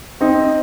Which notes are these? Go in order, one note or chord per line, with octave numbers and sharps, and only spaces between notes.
C4 D#4